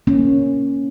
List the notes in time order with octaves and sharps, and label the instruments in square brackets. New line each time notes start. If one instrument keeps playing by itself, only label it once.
[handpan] A#3 C#4